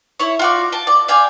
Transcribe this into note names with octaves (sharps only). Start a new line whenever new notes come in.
E4 C#5
F4 F#4 D5
G5 A5
D5
D5 F5 G5 G#5